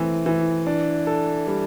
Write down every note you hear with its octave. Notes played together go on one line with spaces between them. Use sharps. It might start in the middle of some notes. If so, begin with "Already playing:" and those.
Already playing: E3 A3 C4
E3
D4
A4
G3